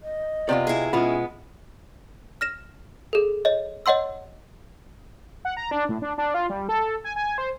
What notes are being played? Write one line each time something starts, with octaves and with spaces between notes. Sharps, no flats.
D#5
C3 B3 F4 D5
E4 G#4
B2 G#3 B3 C#4 F4 B5
F6 A#6 E7
G#4 A4
C#5 D#5
C#5 D#5 F#5 C6 E6
F#5
A#5
D4
A2
D4
D4
F4
G3
A4
G#5
G#5
C5